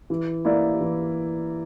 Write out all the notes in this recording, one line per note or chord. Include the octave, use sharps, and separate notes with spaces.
E3
A#3 E4 A#4 D5
E3